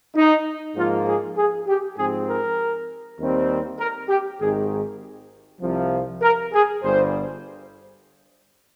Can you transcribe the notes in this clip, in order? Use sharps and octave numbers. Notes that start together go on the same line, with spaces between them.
D#4
G#2 F3 A#3 F4
G#4
G#4
G4
G#2 F3 C4 G#4
A#4
D#2 D#3 G3 C4
A#4
G4
G#1 G#2 D#3 G#4
C2 C3 F3
A#4
G#4
G1 G2 G3 C5